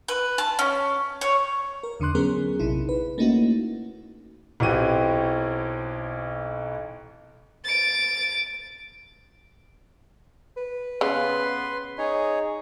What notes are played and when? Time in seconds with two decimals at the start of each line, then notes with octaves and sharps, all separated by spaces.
0.08 B4
0.38 A5
0.59 C#4
1.21 C#5
1.83 A#4
2.00 E2 D3 D4 C6 F#6
2.15 F#3 B3 C#4 G#4 A#4
2.59 A#1 C3 D#4 E4
2.89 B4
3.18 A3 A#3 C#4 D#4 E4 F#4
4.60 B1 E3 C4 F#4 G4 D#7
7.65 A6 D7
10.57 B4
11.01 C#3 B3 B4 C6
11.98 D#4 G#4 C#5